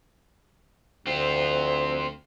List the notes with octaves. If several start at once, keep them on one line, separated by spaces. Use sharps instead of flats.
D2 C4 F4